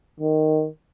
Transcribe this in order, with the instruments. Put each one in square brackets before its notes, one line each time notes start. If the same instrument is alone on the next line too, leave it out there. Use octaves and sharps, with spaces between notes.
[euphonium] D#3